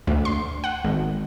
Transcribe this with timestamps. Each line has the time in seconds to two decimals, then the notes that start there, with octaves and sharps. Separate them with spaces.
0.07 D2
0.25 C6
0.64 F#5
0.84 G#1